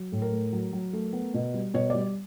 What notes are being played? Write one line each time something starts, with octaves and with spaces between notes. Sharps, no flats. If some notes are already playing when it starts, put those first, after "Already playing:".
Already playing: F#3
A2
A#4
A3
F#3
F#3
A3
B3
B2
G3
B2 C#5
G3 D5